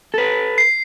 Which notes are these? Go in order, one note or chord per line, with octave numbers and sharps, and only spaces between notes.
A4 B4
C7